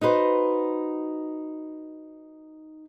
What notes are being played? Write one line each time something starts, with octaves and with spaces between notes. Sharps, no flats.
D#4 F#4 B4 C5